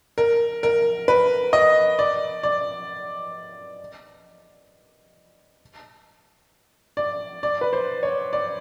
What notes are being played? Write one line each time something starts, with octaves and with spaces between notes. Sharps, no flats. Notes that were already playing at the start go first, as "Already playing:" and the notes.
A#4
A#4
B4
D#5
D5
D5
D5
D5
B4
C5
C#5
D5